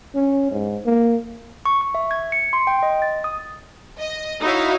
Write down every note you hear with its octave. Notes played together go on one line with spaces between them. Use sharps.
C#4
G#2
A#3
C#6
C#6
E5
G#6
C#7
C6
G5
D#5
A6
D#6
D#5
D#4 E4 F#4 C#5 F5